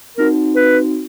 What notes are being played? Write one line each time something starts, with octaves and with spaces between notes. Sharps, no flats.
C4 D#4 F#4 A#4
C4 D#4 F#4 B4